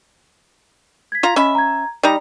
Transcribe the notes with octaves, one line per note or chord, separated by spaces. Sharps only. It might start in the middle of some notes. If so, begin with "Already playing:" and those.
G#6 B6
F4 A#5
C#4 D#5 E5 B5
A#5 G#6
G3 D#4 D5 A#5